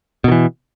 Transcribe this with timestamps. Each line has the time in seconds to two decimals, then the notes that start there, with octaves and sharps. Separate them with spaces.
0.24 B2
0.28 D#3
0.32 E3